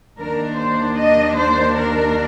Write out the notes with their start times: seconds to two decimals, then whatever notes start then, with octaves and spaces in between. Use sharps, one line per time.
0.19 D#2 D#3 A#3 D4 A#4
0.58 C5
0.97 D#5
1.37 C5
1.76 A#4